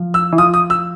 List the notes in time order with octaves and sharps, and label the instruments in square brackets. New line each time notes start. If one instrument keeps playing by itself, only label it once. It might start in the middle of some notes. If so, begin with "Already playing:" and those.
Already playing: [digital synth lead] F3
[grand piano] E6
[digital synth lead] E3
[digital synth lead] F3 [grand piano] D#6
[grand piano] D#6
E6